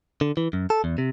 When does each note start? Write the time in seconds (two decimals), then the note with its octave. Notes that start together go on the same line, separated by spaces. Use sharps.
0.21 D3
0.37 E3
0.53 F#2
0.70 A4
0.84 E2
0.98 C3